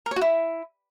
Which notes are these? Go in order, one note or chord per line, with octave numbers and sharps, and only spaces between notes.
A#4
C#5
F#4
E4